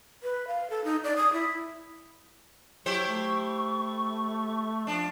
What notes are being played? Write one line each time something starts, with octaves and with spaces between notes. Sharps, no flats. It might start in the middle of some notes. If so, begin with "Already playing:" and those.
B4
F5
A4
D#4
D5
D#6
E4
F#3 E4 G4 C5 C#6
A3
F3 D4 A5